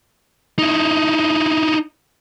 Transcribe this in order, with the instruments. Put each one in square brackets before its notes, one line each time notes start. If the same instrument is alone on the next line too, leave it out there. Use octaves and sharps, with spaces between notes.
[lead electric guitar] D#4 E4